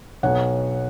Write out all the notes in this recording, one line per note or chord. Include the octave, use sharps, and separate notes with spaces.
B1 B2 C#5 F#5